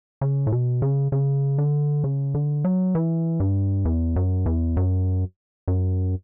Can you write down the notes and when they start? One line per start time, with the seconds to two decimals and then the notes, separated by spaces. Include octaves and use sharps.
0.21 C#3
0.47 A2
0.52 B2
0.82 C#3
1.12 C#3
1.58 D3
2.04 C#3
2.35 D3
2.65 F#3
2.95 E3
3.40 G2
3.85 E2
4.16 F#2
4.46 E2
4.77 F#2
5.68 F#2